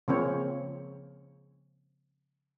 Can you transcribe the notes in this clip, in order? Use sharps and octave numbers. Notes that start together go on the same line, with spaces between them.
C#3 F3 A#3 C4 C#5